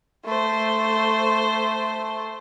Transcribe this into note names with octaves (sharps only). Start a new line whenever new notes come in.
A3 C5